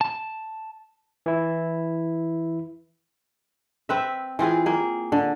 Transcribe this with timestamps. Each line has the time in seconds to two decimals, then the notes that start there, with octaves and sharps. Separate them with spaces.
0.01 A5
1.26 E3 E4
3.89 C4 B4 E5
4.39 E3 C4 F4 G#4
4.66 A#3 G#4
5.12 D3